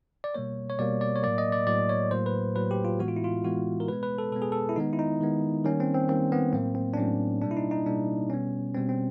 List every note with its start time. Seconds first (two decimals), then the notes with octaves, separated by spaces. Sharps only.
0.24 D5
0.34 B2 G3 A#3 C#5
0.70 C#5
0.79 B2 G3 A#3 D5
1.01 D5
1.16 C#5
1.23 A2 F#3 A#3 D5
1.38 D#5
1.52 D5
1.67 A2 F#3 A#3 D5
1.89 C#5
2.11 A2 F#3 A#3 C5
2.26 B4
2.55 A2 F#3 A#3 B4
2.71 G4
2.85 F4
2.99 A2 E3 G#3 B3 F#4
3.08 F4
3.16 E4
3.24 F4
3.44 A2 E3 G#3 B3 F#4
3.80 A#4
3.88 B2 G#3 B3 B4
4.03 B4
4.18 A4
4.32 B2 G#3 B3 A4
4.42 G#4
4.52 A4
4.69 E4
4.76 D#3 G#3 B3 D#4
4.93 E4
4.99 D#4
5.21 D#3 G#3 B3
5.65 D#3 G3 A#3 C#4
5.80 C4
5.95 C4
6.09 D#3 G3 A#3 C4
6.32 B3
6.53 A2 F#3 A#3 C4
6.75 C4
6.94 D4
6.97 A2 F#3 A#3 C#4
7.42 B2 G3 A#3 D4
7.51 E4
7.57 D#4
7.71 D#4
7.86 B2 G3 A#3 D4
8.30 B2 G3 B3 C#4
8.74 B2 G3 B3 C4
8.89 C4